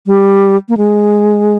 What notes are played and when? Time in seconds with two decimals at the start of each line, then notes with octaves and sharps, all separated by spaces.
0.06 G3
0.69 A#3
0.77 G#3